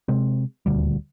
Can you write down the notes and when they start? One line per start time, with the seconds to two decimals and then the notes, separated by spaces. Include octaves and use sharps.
0.08 C3 G#3 C4
0.66 D#1 D2 G3